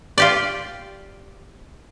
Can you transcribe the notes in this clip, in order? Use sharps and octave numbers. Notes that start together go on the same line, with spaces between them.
F4 G4 D5